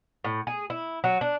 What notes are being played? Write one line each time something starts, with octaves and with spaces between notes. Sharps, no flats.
A2
G#4
E4
F#3
D4